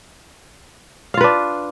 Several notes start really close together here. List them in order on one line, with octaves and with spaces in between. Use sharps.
F5 F4 B4 D4